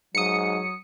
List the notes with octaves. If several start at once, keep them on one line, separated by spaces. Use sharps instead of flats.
G#2 F#3 D#6 C#7